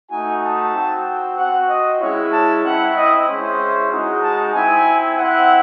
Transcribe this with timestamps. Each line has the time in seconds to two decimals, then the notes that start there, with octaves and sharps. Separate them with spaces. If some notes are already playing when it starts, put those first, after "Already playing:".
0.11 A3 D#4 F#4 G#5
0.43 A5
0.74 C4 F#4
1.37 C4 F#4 F#5
1.69 D#5
2.00 G#3 C#4 E4 C#5
2.32 A5
2.64 C4 E4 F#5
2.96 D#5
3.27 G#3 C#4 E4 C5
3.90 G#3 D#4 F#4
4.22 A5
4.54 C4 E4 G#5
5.17 C4 E4 F#5